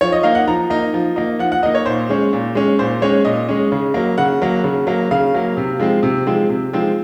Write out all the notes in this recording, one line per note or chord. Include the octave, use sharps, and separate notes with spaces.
F3 C#5
D#5
A#3 D#4 F5
F#5
F3 A#5
A#3 D#4
F3
A#3 D#4
F3 F#5
F#5
A#3 D#4 D#5
C#5
A#2 C5
G#3 C#4
A#2
G#3 C#4
A#2 C5
G#3 C#4 C#5
A#2 D#5
G#3 C#4
C#3
F#3 A#3
C#3 F#5
F#3 A#3
C#3
F#3 A#3
C#3 F5
F#3 A#3
C3
F3 G#3 C4
C3
F3 G#3 C4
C3
F3 G#3 C4